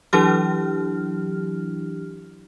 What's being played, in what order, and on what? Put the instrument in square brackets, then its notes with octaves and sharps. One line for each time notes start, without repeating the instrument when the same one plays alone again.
[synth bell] E3 F#3 D4 E4 G4 F6